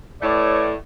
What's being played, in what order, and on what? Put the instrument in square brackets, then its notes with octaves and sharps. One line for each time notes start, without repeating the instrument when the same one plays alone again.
[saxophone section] A2 A3 [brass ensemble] B4 C#5 D5